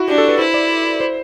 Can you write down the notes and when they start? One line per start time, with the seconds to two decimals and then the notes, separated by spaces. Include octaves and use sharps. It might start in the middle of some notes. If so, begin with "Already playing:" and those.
Already playing: E4 F#4
0.08 D4 G4
0.18 A4
0.28 B4
0.39 E4 C5
0.54 D5
1.00 C5